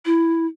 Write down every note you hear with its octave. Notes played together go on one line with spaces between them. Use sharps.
E4